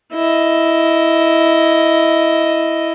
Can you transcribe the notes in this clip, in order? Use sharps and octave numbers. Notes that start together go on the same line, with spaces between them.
E4 D#5